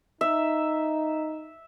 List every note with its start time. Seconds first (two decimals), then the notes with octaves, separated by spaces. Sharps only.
0.21 D#4 E5